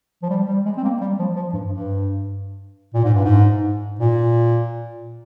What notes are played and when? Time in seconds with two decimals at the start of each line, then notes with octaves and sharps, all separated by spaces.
0.23 F3
0.30 G3
0.48 G3
0.66 G#3
0.77 C4
0.84 A#3
1.01 G3
1.19 F3
1.36 F3
1.53 G2
1.72 G2
2.94 A#2
3.04 G#2
3.14 G2
3.24 G#2
3.99 A#2